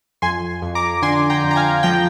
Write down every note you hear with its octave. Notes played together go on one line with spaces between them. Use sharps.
F2 G#5 C6
F2
A#5 D6
D3 G#5 C6
G5 A#5
F2
A#5
F5 G#5
F3 G5 A#5